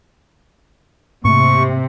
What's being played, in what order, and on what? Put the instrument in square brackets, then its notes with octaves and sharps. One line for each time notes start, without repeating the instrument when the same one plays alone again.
[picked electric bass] G#2 A3 A#3 [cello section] C3 [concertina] C#6